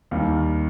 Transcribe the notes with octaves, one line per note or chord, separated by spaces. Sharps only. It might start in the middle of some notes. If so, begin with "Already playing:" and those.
D#2 D#3 G3